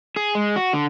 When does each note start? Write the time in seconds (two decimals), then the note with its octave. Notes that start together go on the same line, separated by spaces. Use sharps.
0.16 G#4
0.35 G#3
0.56 F#4
0.73 D3